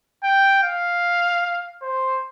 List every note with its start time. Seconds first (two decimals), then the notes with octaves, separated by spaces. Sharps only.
0.24 G5
0.63 F5
1.82 C5